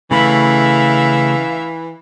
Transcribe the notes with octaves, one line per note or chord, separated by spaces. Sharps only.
C#3 E3 A3 E5 F5 B5